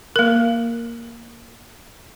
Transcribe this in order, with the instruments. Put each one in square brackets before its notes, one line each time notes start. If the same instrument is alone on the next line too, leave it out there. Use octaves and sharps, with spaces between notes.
[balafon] A#3 A#4